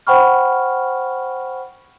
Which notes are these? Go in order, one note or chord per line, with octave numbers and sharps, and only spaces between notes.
C5 F#5 G5 B5 C#6 F6